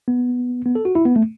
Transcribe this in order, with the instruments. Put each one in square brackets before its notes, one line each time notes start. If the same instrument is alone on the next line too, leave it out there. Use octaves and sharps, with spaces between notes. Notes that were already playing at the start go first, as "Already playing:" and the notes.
[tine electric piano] B3
B3
A4
F#4
E4
B3
A3